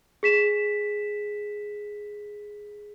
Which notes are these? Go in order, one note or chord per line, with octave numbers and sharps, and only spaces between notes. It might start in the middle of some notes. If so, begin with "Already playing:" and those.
G#4 B6 E7